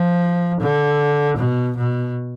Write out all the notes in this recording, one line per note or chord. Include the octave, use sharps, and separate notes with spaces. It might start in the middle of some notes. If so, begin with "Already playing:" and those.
Already playing: F3
D3
B2
B2